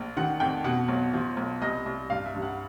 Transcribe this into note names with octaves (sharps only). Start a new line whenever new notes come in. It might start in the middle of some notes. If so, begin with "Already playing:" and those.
Already playing: A#1
D#3 F#5
F2 G5
B2 F#5
B1
F3
B1
C2 D#5
C2
G2 F5
E5
G2
F#5